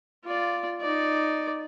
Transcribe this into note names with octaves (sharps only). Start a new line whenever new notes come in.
F4 D5
D#4 D5